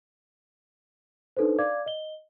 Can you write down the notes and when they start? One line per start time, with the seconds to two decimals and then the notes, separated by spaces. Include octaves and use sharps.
1.37 D4 D#4 A4 B4 C5
1.58 D5 F5 D6 G#6
1.86 D#5 G7